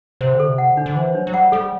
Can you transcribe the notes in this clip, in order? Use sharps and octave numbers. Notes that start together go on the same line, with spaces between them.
C3 C5
D3
A4
C3
F#5
D3
D4
D3
E3 C5
F#3 D4
F#3
G3 F#5
G3 A4